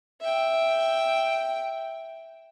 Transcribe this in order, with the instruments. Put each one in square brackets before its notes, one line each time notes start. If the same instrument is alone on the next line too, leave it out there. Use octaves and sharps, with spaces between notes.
[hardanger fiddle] E5 G5